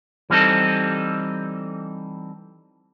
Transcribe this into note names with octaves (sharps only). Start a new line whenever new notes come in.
E3 G3 C4 D#4 A4